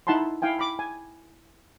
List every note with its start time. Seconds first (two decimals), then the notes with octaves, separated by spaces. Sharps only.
0.07 D#4 E4 F#5 A5 B5 C6
0.42 E4 F5 G5 G#5
0.59 B5 D6
0.79 G#5